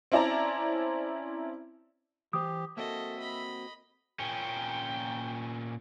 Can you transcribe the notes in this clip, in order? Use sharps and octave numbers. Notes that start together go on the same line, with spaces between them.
C4 C#4 E4 D5 A5 A#5
E3 G4 C5 D#6
A#3 C4 F#4 A4 D#5 E5
D#5 B5
A#2 C#4 G5